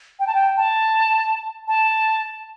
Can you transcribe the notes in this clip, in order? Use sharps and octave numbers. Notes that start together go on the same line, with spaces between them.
G5
A5
G5
A5
A5